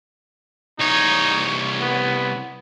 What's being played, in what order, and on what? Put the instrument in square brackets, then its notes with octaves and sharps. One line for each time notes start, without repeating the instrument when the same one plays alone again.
[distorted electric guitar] C2 C#5 [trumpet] D#4
[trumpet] B3